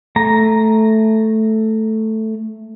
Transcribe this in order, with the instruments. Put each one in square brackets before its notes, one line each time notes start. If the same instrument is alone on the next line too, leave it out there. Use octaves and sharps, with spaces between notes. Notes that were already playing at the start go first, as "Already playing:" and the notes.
[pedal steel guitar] A3 A#5